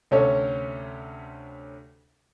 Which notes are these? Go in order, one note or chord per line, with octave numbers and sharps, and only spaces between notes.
D2 C3 C#4 A4 C#5